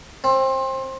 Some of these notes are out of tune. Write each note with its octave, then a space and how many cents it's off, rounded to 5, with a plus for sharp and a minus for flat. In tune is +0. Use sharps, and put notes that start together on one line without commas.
C4 +25